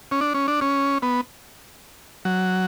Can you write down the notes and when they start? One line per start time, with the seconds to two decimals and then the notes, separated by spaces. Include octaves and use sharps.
0.11 C#4
0.21 D4
0.34 C#4
0.48 D4
0.61 C#4
1.02 B3
2.25 F#3